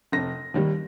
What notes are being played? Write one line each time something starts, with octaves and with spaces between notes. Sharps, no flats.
F1 A#6
D#2 D#3 G3